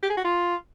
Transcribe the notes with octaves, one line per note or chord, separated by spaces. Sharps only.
G4
G#4
F#4
F4